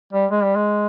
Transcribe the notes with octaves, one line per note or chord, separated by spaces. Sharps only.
G3
G#3
G3
G#3